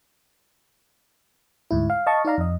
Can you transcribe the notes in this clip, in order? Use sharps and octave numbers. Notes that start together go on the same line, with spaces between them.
D2 G#2 E4
F5
D#5 F5 A5 C#6
D#4 D5 F5 A#5
F2 D#5